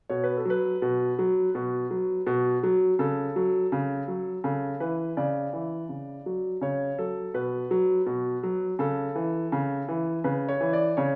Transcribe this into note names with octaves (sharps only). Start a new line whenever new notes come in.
B2 C#5
B4
A4
F#3 B4
B2
F#3
B2
F#3
B2
F#3
C#3 A4
F#3
C#3
F#3
C#3 A4
E3 B4
C#3 D5
E3
C#3
F#3
C#3 C#5
F#3 A4
B2 B4
F#3
B2
F#3
C#3 A4
E3
C#3
E3
C#3 B4
C#5
E3
D5
C#3 C#5